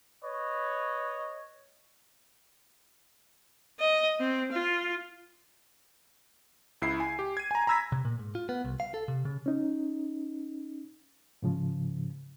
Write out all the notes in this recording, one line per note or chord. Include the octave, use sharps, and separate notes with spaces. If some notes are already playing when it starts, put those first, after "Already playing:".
B4 C#5 D#5
D#5
C4
F4
C#2 E4 C7
G#5
G4
G#6 D#7
G#5 A#5
A#5 B5 E6 G#6 A#6 B6
C3
A#2
G#2
F4
B3
C2
F5
A4
C3
C#3
C#4 D#4
G#2 C#3 F3